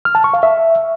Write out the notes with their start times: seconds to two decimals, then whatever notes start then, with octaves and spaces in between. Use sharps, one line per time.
0.05 F6
0.15 A5
0.24 C#6
0.34 F5
0.43 E5